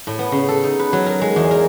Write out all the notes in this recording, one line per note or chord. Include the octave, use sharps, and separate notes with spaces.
A2
B3
C#3
A4
D#4
B4
F#3
A#4
G#3
E2
A#4